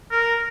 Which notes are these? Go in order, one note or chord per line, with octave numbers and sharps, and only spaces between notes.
A#4